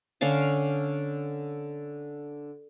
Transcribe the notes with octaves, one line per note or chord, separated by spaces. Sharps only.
D3 C#4 F5 A5